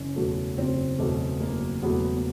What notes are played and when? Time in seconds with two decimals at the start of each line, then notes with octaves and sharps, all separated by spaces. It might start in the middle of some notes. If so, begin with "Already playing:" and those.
Already playing: F#1 C#4
0.16 E2 B2 F#3 A3
0.58 F#1 C4
0.99 E2 B2 F#3 A3
1.40 F#1 A#3
1.82 E2 B2 F#3 A3 B3
2.16 B3